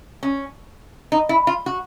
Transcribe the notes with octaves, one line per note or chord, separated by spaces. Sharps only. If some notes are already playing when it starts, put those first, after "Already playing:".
C#4
D#4
E4
F4
F#4